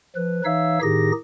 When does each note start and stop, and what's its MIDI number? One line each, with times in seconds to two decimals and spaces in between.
0.16 0.41 53
0.16 0.41 71
0.45 0.79 52
0.45 0.79 63
0.45 0.79 73
0.45 0.79 76
0.45 0.79 77
0.45 0.79 88
0.82 1.12 45
0.82 1.12 51
0.82 1.12 63
0.82 1.12 67
0.82 1.12 68
0.82 1.12 94